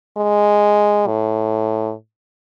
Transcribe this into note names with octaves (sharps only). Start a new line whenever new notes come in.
G#3
A2